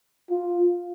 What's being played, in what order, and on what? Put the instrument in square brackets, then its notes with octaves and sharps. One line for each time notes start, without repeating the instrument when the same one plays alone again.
[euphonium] F4